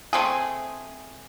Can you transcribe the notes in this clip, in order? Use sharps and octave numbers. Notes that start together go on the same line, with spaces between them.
A3 C4 G#4